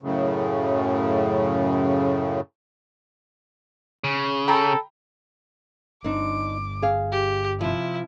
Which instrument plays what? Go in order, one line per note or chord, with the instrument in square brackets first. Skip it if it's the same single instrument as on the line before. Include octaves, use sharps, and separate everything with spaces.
[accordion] F#2 A2 C#3
[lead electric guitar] C#3
[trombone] A4 [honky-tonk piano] G5 A#5 B5
[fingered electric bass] G1 [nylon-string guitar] C4 D4 D#4 [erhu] D6
[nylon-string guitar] G#4 F5
[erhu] G4
[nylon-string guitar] C3 F3 [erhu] E4